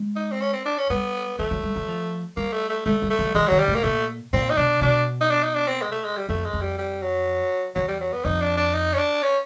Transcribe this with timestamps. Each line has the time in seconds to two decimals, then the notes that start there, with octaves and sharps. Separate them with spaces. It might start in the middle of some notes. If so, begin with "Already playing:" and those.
Already playing: G#3
0.16 D#4
0.32 C4
0.41 C#4
0.53 C4
0.65 D4
0.78 C#4
0.90 G3 B3
1.39 F3 A3
1.51 F#3
1.63 G3
1.76 F#3
1.88 F3
2.36 G3 A#3
2.53 A3
2.70 A3
2.86 G#3 A3
3.02 G3
3.10 A3
3.19 F#3
3.35 E3 G#3
3.48 D#3 F#3
3.59 G3
3.68 A2
3.75 A#3
3.84 A#2 A3
4.33 A#2 C4
4.50 D#4
4.57 B2 D4
4.81 B2 D4
5.21 D#4
5.31 D4
5.43 D#4
5.55 D4
5.67 C4
5.82 G#3
5.92 A3
6.04 G#3
6.17 G3
6.29 F2 A3
6.45 G#3
6.53 F2
6.61 G3
6.78 G3
7.02 F#3
7.75 E2 F#3
7.88 G3
8.00 F#3
8.13 B3
8.25 F2 D#4
8.41 D4
8.57 D4
8.74 D#4
8.94 C#4
8.98 D4
9.23 C#4